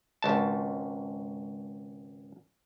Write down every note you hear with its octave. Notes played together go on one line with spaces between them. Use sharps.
G#1 C#2 A5